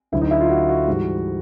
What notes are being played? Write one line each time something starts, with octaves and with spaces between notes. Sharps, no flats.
D2 D3 F#3 E4
D#4
E4
F4
F#4
F#4
G#2 E3 G3